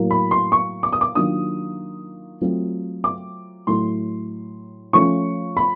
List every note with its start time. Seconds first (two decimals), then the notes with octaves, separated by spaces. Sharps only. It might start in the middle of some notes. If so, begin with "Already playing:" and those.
Already playing: A2 F#3 A#3
0.11 B5
0.31 C6
0.52 C#6
0.83 D6
0.93 D#6
1.01 D6
1.15 D#3 F#3 A#3 D4 F4 D#6
2.41 F#3 A3 C4 F4
3.04 D6
3.67 A2 F#3 A3 C6
4.93 F3 A3 C#4 F4 C#6
5.57 B5